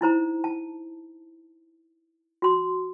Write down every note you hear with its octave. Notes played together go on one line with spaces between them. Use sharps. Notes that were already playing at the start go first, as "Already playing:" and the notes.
D#4 E4 C5 A#5
A5
F#4 C6